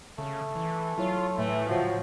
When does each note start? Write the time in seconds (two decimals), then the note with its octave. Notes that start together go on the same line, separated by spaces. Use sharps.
0.18 C#3 A3
0.55 E3
0.98 F#3 E4 F4 C#5
1.38 A2 E3 A3
1.70 G#2 C#3 F3 F#3 C5